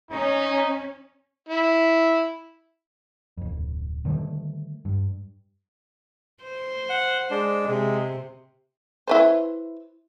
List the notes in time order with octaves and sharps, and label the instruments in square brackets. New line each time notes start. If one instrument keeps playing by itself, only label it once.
[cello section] C#4 [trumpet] D#4
[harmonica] E4
[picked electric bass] D1 F2
D3 D#3 G3 A3
G2
[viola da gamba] C5
[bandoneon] F#5
G#3 D4
[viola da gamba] C3 [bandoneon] G#3
[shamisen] E4 B4 C5